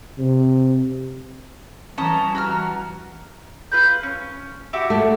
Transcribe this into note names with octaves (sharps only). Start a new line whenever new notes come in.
C3
E3 G3 C#4 A5 A#5 D#6
F#4 E6 F6
F4 B4 G6
C#4
E4 F#4 G4
A3